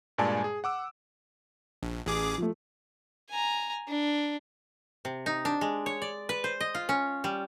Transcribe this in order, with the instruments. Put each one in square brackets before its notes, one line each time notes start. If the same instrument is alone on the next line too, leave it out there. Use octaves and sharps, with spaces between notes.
[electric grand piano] G2 A#2 G#3 D5 G#5 A5
G#4
F#5 D6 E6
[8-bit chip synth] A#1
A1 G#4 D6
[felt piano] F3 A3
[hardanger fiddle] G#5 A#5
D4
[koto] C3
D#4
D4
G#3
C#5
D5
B4
C5
D#5
F4
C#4
G3